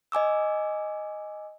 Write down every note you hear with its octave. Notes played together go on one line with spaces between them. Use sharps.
D#5 G#5 D6 E6